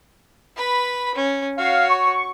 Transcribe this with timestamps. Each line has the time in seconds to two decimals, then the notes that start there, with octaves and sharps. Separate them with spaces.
0.56 B4 B5
1.15 C#4
1.58 F#4 C#5 F5
1.89 C#6